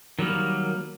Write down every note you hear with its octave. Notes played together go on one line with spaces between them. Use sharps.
D#3 F#3 G3 A#3